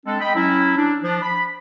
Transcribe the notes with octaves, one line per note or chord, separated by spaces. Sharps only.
G#3 C4 D4 A4
D#5 G5 B5
F#3 C#4 E4
D4
F3 D4
B5